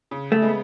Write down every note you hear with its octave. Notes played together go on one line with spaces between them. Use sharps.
C#3
A3
G#3 B3